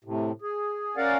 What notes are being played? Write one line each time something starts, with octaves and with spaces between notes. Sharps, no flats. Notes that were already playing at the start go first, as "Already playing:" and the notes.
A2 C3
G#4
C#4 A#4 D5 F5 F#5